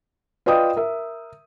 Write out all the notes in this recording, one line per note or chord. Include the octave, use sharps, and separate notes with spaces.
F4 B4 D5 D#5 G5 D#6
A#4 E5